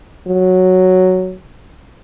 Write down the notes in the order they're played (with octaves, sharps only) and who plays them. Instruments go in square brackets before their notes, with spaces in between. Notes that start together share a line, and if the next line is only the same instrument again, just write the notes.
[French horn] F#3